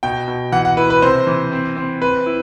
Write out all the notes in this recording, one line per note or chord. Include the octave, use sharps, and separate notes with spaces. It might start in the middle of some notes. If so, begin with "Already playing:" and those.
B2 G5
B2
E3 F#5
F#5
E4 B4
B4
C3 C5
E3
C4
C4
C4 B4
E4